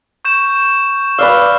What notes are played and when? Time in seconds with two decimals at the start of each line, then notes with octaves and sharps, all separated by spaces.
0.25 C#6 G6 E7
1.18 B4 D5 F5 E6 F6